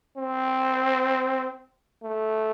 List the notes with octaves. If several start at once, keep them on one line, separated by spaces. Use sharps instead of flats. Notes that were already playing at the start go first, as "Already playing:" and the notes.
C4
A3